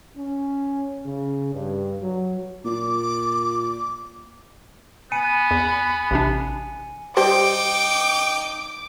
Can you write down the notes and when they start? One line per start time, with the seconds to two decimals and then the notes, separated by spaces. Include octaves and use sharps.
0.17 C#4
1.05 C#3
1.53 G2
2.02 F#3
2.65 A#2 D6
5.12 B3 G#5 B5 C#7 D#7
5.51 E2
6.11 A1 C3 D4
7.17 G3 D#4 G4 C5 G5 D6